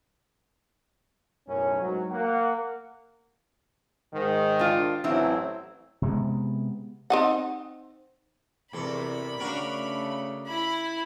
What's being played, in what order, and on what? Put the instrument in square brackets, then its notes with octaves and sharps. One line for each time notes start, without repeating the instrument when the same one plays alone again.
[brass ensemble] B1 F#2 A2 C#4
G#2 F#3
A#3 F#5
[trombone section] G#2 D#3
[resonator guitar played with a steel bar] D4 F4
[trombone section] A1 F#3 [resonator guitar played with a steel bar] C4 E4
[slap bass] C3 G#3 B3
[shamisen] C4 D#4 F#5
[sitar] E2 A4 [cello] C3 A#4 [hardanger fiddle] B5
[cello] C#3 A3 [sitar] D4 F#4 A#4
[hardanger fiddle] E4 B5